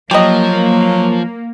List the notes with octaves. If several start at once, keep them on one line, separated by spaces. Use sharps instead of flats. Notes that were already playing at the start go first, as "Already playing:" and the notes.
F3 F#3 A#3 G4 B4 D#5